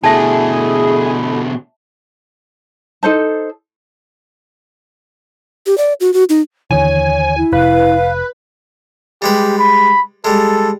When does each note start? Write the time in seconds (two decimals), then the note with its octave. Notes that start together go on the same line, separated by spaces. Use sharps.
0.04 B2 D3 A3 E4 G#4 D#5 E5 A5
3.03 D#4 A4 C5 A5
5.66 G4
5.78 D5
6.00 F#4
6.14 F#4
6.30 D#4
6.71 D#2 D3 E3 C#5 G#5
7.37 E4
7.53 F1 B4 F5
9.22 G3 G#3 G4 B4
9.59 B5
10.25 G3 G#3 A4